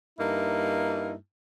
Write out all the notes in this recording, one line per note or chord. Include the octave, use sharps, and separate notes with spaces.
G2 A#3 D#4 E4